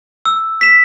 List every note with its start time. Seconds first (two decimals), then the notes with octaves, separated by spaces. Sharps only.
0.25 E6
0.61 B6 E7